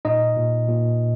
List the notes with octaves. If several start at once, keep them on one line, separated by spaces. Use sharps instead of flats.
A#2 D#4 D#5
A#2
A#2